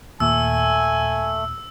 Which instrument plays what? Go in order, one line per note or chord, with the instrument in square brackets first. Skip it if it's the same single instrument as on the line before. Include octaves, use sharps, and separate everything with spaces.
[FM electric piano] D#2 A#2 [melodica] A3 [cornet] G#5 [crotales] E6